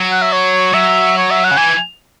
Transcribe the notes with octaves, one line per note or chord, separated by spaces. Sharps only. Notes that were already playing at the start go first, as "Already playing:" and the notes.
Already playing: F#3
F#5
E5
C#5
F#3 E5
C#5
E5
F#5
C#3
E3 G#5